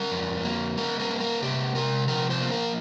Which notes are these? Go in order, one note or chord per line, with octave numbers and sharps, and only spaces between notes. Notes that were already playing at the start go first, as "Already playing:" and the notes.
Already playing: G3 A#4
F2
A#3
G3 A#4
A#4
A#3
A#4
C3 G4
C3 A#4
F3 A#4
C5
A#3
A#4